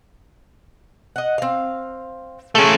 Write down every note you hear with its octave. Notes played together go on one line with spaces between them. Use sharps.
D#5 F#5
C4 F5
C#3 F#3 A3 C#4